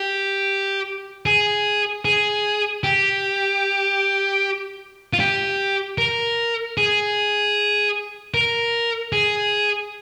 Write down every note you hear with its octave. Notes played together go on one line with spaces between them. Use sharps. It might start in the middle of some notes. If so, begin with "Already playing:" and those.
Already playing: G4
G#4
G#4
G4
F4
G4
A#4
G#4
A#4
G#4